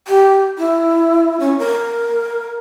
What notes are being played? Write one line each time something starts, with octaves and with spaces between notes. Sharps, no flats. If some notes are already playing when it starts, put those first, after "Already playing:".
G4
E4
C#4
A#4